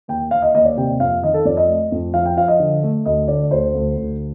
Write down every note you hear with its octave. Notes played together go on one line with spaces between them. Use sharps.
D#2 G5
D#2 F5
D#5
D#2 D#5
D5
C3 G5
F2 F5
D#3 D#5
A4
F2 D5
D#5
A3
F2
F3 F5
G5
F3 F5
D#5
D3
A3
D2 D#5
D3 D5
D2 C5
D2
D2